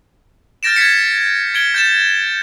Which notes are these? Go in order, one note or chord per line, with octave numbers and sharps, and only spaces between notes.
F6 G6 A6 A#6 D7 E7
G#6 A6 B6 C#7
G#6 D7 G7
G6 A6 E7